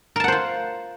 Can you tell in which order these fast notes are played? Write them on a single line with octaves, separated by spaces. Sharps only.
A#4 A5 F#5 C5 F4